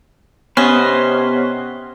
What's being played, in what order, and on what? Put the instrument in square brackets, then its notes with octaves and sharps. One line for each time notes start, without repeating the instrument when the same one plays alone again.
[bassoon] C3 [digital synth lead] B3 [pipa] C#4 [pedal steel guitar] B4 C5 D#5